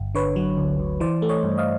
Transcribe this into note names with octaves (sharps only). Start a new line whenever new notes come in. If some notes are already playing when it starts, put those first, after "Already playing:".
Already playing: G1
D3 B4 C#5
F#3
D2
D2
E3 C5 D5
A3
C#5 D#5
G2
D#5 F5